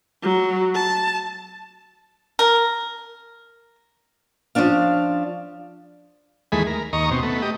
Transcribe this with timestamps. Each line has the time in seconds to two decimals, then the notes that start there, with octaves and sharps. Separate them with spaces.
0.23 F#3
0.74 A5
2.39 A#4
4.55 F3 A#3 C#4 D4 F5
6.52 D#2 E3 G#3 A3 G#4 B5
6.67 A#4
6.93 D#2 D#5 A#5 C#6
7.11 B2 C4
7.23 A3 B3
7.42 G4 D#5